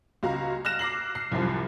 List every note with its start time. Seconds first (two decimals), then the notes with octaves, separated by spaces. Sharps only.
0.23 C#2 F#4 F5 A#5
0.65 F6 F#6 A#6 E7
0.79 D6 A#6 C7 F#7
1.15 C7
1.32 C2 F#2 F3